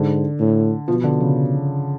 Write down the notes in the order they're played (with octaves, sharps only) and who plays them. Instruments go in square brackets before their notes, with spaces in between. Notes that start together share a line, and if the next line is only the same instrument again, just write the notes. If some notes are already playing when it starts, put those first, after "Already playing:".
Already playing: [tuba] G#2 [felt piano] D3
[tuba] A2
[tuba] B2 [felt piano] F3
[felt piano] D3
C#3